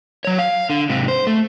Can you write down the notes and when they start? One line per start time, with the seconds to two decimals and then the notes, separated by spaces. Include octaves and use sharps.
0.25 F#3 C#5
0.39 F5
0.70 D3
0.89 G#2 C3
1.08 C5
1.27 A3